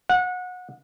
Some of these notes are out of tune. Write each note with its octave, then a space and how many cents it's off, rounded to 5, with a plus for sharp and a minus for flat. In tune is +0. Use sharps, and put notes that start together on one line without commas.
F#5 -25